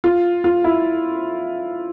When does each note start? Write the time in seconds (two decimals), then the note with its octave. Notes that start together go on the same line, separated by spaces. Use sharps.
0.04 F4
0.44 F4
0.64 E4